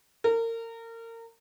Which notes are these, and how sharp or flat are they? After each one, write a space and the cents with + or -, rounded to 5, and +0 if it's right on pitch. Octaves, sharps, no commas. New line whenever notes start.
A#4 -30